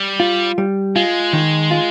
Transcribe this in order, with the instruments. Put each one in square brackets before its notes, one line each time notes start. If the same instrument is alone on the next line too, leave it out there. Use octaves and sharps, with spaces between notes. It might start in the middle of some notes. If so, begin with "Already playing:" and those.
Already playing: [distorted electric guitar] G3
[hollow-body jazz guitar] F4
G3
[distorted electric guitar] G#3 [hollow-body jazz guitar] F4
[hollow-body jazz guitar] D#3
F4